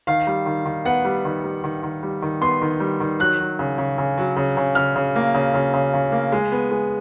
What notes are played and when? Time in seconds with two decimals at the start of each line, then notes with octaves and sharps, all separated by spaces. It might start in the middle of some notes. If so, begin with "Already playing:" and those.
0.07 D#3 F5
0.27 G3
0.46 D#3
0.65 D#3
0.85 B3 F#5
1.05 G3
1.25 D#3
1.44 G3
1.64 D#3
1.83 D#3
2.03 G3
2.22 D#3
2.41 B3 C6
2.62 D#3
2.80 G3
3.00 D#3
3.20 F#3 F#6
3.39 F#3
3.59 C#3
3.78 C#3
3.98 C#3
4.18 F#3
4.36 C#3
4.57 C#3
4.75 C#3 F6
4.96 C#3
5.15 A#3
5.34 C#3
5.54 C#3
5.73 C#3
5.94 C#3
6.12 A#3
6.32 G#3
6.52 B3
6.71 G#3